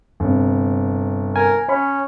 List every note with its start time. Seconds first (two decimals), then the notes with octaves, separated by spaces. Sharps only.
0.20 G1 C3
1.36 A#4 G#5
1.68 C#4 C#5 B5